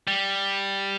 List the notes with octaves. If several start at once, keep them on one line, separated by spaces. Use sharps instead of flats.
G3